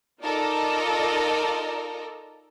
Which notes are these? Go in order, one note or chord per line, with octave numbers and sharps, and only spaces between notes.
D#4 F4 A4 A#4 D5 D#5